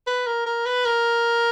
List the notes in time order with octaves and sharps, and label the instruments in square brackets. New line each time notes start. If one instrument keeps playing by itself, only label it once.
[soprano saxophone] B4
A#4
A#4
B4
A#4